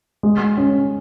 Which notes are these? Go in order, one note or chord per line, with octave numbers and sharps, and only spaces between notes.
G#3
C#4